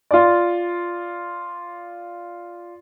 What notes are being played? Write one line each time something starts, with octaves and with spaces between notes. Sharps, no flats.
F4 D5